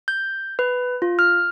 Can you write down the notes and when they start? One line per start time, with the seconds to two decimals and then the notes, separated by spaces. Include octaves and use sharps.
0.08 G6
0.59 B4
1.02 F4
1.19 F6